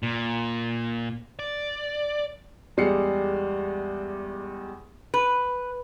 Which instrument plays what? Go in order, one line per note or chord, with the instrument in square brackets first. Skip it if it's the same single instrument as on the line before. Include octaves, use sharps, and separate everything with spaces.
[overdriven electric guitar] A#2
D5
[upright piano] E2 G3 G#3 C7 C#7
[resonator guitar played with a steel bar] B4